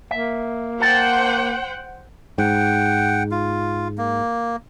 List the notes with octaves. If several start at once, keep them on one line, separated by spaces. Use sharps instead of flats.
A#3 E5
C5 F#5 G5 A5
G#2 F#5 G5
F4
A#3